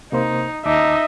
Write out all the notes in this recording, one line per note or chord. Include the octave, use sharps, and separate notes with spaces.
C3 A#3 D#4 C5
D#2 D#4 D#5 E5 A5 D6